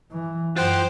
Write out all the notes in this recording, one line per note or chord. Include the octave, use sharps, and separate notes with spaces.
E3
F#2 F4 C5 F#5 G5